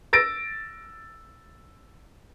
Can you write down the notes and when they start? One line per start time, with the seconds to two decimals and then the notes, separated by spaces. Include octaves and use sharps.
0.13 E6 A6 A#6 D7